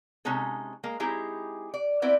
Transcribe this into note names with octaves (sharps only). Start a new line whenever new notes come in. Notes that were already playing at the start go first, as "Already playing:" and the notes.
C3 G#3 C#4 D#4 A4
G#3 A#3
G#3 C4 D#4 E4 G4 G#4
D5
B3 C4 E4 D5